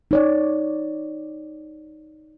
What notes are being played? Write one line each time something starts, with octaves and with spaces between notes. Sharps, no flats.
D#4 C#5 D5